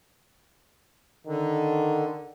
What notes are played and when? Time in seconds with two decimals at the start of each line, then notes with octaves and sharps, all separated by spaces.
1.27 D3 D#3